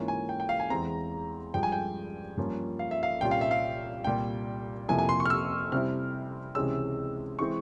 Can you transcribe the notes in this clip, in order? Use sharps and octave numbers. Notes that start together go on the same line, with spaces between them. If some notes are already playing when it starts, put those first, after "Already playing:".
Already playing: G#2 E3 A#3 C#4 F4
G#5
G5
G5
F5
G#5
E2 E3 G#3 C4 A#5
G2 F3 G#3 G5
G#5
G5
G2 F3 A#3 C#4 F4
F5
E5
F5
C2 A#2 G3 C#4 F4 G5
F5
E5
F5
C2 A#2 G3 G5
F2 C3 F3 A#3 E4 G#5
G#5
C6
C#6
F6
E6
C3 G3 C4 E4 F6
C#2 C3 E3 G#3 C#4 E6
E3 G#3 C4 E4 C#6